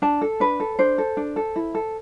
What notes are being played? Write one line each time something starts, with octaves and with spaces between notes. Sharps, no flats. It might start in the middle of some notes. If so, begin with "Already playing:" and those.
D4 A5
A4
D4 B4
A4
D4 C5
A4
D4
A4
E4
A4